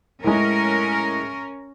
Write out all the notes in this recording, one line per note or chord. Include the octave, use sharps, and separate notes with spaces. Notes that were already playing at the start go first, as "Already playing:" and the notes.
A2 G#3 C#4 A#4